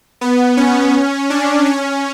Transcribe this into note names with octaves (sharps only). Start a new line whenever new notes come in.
B3
C#4
D4
C#4